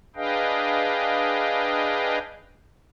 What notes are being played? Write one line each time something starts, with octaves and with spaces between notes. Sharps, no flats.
D4 G#4 B4 D#5 F5 G5